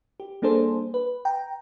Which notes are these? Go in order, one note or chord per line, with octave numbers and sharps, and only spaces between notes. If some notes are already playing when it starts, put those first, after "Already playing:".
G4
G3 A#3 D4 G#4 A4 C5
B4
G5 A#5